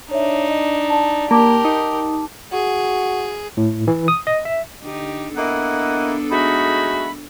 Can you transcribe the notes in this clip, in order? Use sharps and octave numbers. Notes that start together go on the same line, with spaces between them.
D4 D#4 C#5 E5
D#5
D5 A5
A#3 G4 A#4 A5 D6
D#4
F#4 G#4
A2
E3
D#6
D#5
E5
D3 D#4 G4
A#3 B3 D4 E4 A4 D#5 F#5
G#3 A3 D#4 F#4 B5